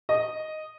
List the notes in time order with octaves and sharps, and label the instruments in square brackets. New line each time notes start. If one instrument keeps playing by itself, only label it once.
[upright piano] D#5